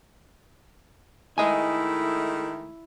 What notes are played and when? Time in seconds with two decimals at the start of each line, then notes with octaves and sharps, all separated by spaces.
1.38 D#3 G#3 A3 E4 D#5 G#5